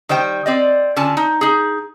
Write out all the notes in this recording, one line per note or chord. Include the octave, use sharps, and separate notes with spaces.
D#3 G3 C5 G5
C4 D5 D#5
D3 C#4 F4 A5
D#4
D#4 G#4